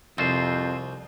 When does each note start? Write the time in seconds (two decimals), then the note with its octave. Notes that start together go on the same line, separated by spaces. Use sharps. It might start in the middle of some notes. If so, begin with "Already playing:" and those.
0.18 C2 F2 C4 F4 C5